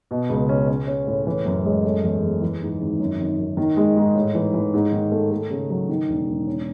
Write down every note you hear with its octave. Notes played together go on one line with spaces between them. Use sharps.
B2
C#2
C#4
C#4
C#4
A2
E3
F#2
G#3
A3
E2
E2
E3
G#2
G#1
F#2
G#1
G#1
D#3
G#3
G#2
A2
E3
E3
G#2
D#3
A3
A3
C#3
F#3
D#3
E1
E1
C#4